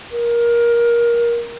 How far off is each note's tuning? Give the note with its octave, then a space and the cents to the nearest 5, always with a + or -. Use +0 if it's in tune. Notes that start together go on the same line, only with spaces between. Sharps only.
A#4 +20